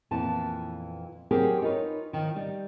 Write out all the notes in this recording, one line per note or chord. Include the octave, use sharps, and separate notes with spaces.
F2 A#2 E3 B3 A5
F#3 C4 G4 G#4 A#4 C5
D#4 F4 A#4 B4 C#5
D#3 F3
G3 D#4